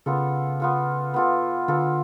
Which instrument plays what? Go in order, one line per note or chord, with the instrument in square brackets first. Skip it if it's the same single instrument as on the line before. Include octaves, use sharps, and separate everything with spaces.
[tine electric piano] C#3 [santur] B3 F4 A4
[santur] B3 F4 A4
B3 F4 A4
[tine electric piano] D3 [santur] B3 F4 A4